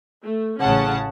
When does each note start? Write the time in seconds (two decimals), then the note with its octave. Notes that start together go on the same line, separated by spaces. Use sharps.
0.24 A3
0.60 A1 C#3 C#4 F#5 A5